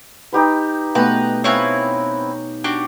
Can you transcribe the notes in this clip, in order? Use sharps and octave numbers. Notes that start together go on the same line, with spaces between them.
D#4 G4 B4
B2 A3 B3 B4 G5 A#5
C4 E4 B4 C#5 F5 G#5
D4 F#4 G4